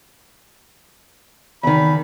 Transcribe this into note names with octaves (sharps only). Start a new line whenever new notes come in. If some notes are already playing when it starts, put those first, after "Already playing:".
E2 D#3 B5